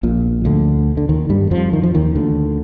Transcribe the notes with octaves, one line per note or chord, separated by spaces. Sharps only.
A#1 A#2
D2 D3
D3
D#2 D#3
G2 G3
F2 F3
D#3
F3
D#2 D#3
D2 D3